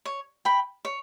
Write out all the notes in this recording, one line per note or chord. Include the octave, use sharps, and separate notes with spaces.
C#5
G5 B5
C#5